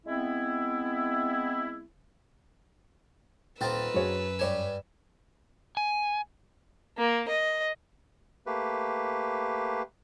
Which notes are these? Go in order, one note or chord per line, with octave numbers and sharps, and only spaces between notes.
G#3 B3 C4 E4
D#1 C4 D#4 F4 B4 G5 E6 A6
F#2 F#4 G#4 C#5
G2 G4 C#5 G#5 E7
G#5
A#3
D#5
A3 A#3 G4 B4